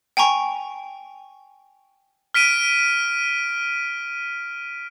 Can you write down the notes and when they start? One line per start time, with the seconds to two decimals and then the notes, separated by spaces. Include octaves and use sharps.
0.17 G5 G#5 A#5 C#6
2.34 F6 B6 D7 D#7